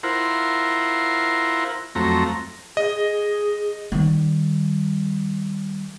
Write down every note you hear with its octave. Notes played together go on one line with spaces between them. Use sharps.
E4 F4 A#4 C5 F#5
F2 F#3 A3 C4 A#5
G#4 D#5
D#3 G3